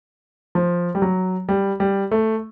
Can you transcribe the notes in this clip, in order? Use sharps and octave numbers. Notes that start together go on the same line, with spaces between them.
F3
G3
F#3
G3
G3
A3